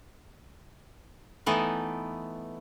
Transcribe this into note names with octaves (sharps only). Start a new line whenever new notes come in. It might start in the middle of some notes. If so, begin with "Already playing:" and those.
E3 A3 B3 D#4